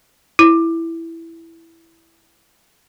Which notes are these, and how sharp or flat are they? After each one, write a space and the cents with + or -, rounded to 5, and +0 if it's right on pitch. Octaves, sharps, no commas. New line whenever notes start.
E4 +5